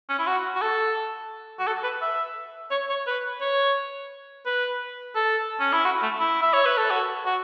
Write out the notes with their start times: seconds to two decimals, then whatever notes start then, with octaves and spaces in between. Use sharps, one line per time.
0.09 C#4
0.19 E4
0.27 F#4
0.55 F#4
0.62 A4
1.59 F#4
1.67 A4
1.84 B4
2.02 E5
2.71 C#5
2.89 C#5
3.07 B4
3.41 C#5
4.46 B4
5.15 A4
5.60 C#4
5.73 E4
5.85 F#4
6.02 A3
6.20 E4
6.42 E5
6.53 C#5
6.65 B4
6.77 A4
6.91 F#4
7.25 F#4